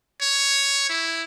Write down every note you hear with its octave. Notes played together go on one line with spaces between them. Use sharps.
C#5
E4